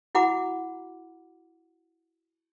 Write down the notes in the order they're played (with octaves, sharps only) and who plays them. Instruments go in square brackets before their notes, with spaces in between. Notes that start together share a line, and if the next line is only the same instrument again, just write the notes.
[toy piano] E4 F#4 F#5 A#5 B5 D6